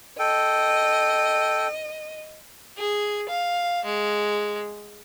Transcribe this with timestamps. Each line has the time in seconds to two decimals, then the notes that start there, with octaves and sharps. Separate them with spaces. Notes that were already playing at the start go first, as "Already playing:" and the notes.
0.19 A4 D#5 G5
2.78 G#4
3.29 F5
3.85 G#3